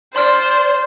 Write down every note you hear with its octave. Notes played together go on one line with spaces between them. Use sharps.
C5 D5 C6 F6